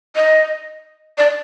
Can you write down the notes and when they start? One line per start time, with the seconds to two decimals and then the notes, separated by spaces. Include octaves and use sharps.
0.16 D#5
1.18 D5